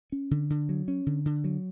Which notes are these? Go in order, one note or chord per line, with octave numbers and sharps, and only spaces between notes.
C#4
D3
D3
F#3
C#4
D3
D3
F#3